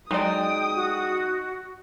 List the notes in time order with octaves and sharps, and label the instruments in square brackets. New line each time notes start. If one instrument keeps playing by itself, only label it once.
[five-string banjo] F#3 G#3 D5 [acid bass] D#4 [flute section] G5 [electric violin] D#6
[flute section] F#4